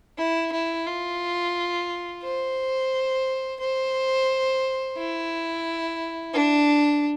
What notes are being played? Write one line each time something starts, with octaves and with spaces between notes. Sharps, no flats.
E4
E4
F4
C5
C5
E4
D4